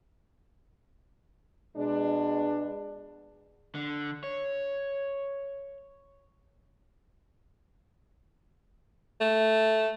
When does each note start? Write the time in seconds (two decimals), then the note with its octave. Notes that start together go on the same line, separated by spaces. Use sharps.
1.77 B2 G#3 D4
3.75 D3
4.24 C#5
9.20 A3